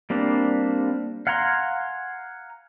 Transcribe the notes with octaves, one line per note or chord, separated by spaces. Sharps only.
G3 A#3 C4 D4
F5 F#5 G#5 A#5 C6